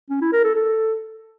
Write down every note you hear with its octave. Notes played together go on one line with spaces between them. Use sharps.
C#4
E4
A#4
A4
A4